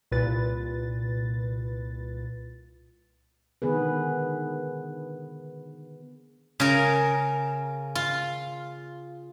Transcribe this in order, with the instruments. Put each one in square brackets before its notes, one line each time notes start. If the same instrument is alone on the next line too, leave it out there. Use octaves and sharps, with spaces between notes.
[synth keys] C2 A#2 B4 A6
[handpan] D3 D#3 B3 G#4 B4
[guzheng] C#3 A#4
F4